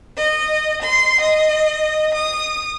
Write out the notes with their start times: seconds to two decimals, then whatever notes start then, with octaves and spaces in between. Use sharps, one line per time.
0.16 D#5
0.82 C6
1.19 D#5
2.13 D#6